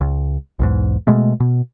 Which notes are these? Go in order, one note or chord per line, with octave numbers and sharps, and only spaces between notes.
C#2
B1 E2 G#2
B2 G#3 A3
B2